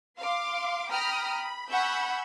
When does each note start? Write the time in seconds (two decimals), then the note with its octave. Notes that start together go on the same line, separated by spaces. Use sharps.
0.19 F5 C6 D6
0.93 G5 A#5 B5 D#6 F6
1.34 B5
1.70 F#5 G#5 B5 C#6 E6 G6